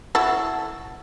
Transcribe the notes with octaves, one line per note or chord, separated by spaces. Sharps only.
E4 F#4 A4